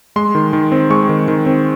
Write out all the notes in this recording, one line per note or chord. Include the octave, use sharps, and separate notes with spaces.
G#3 C6
D#3
D#3
C4
G#3 C#6
D#3
D#3
C4